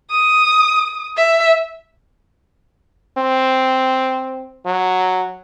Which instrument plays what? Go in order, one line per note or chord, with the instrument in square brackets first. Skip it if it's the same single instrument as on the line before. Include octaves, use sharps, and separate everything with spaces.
[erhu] D#6
E5
[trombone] C4
F#3